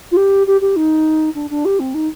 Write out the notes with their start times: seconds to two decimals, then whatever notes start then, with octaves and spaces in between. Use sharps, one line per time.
0.11 F4
0.16 G4
0.47 G4
0.61 G4
0.76 D#4
1.35 D4
1.50 D4
1.65 G4
1.79 C4
1.94 D#4